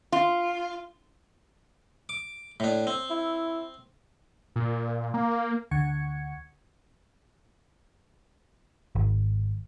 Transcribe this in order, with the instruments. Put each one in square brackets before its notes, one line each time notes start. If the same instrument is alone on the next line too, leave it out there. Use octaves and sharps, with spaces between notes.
[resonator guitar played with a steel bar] F4
[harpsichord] D6
A2 D4
C4
[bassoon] E4
[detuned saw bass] A#2
A#3
[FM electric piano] D2 D3 F#5 C#6 G#6 C#7
[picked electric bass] G#1